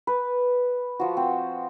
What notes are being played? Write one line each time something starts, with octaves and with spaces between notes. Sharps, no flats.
B4
F3 F#4
C4